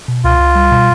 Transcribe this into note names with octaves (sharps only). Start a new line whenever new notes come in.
B2
C#2 F4
C#2
G3
B2